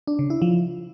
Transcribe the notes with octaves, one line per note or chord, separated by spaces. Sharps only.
D4
C#3
E4
F3